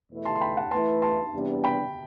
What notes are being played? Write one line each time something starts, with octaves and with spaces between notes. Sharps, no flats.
E2 B2 A3 E4 B4
A5 C6
C6
G5 B5
F#5 A5
E3 A3 E4 B4 A5 C6
A5 C6
E2 C3 G3 B3 D4
G5 B5